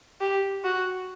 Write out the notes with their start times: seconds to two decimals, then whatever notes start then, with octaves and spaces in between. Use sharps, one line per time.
0.21 G4
0.64 F#4